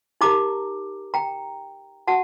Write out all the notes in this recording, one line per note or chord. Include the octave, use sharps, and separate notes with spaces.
D#4 G4 A#4 A#5 D6
G5 A#5
F#4 F#5 A5